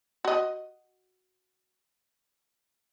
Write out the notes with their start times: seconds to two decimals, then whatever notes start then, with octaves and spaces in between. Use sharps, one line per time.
0.25 F#4 D#5